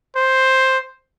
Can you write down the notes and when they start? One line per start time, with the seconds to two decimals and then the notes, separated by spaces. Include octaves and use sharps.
0.16 C5